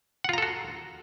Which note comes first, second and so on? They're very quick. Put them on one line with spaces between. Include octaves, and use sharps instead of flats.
F#5 F4 A#5 A4 F#4